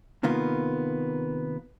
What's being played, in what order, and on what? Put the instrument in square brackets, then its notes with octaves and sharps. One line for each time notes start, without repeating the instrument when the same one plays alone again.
[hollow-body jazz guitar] C3 D#3 A#3 B3 F4